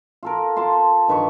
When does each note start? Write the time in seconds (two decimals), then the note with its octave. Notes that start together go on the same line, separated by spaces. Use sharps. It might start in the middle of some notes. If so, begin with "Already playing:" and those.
0.23 F4 A4 A#4
0.56 F4 A5 C6
1.08 G2 D#3 B4 C#6